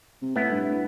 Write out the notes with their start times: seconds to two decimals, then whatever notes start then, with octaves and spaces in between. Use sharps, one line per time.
0.22 C3
0.36 A2 B3 E4
0.51 G2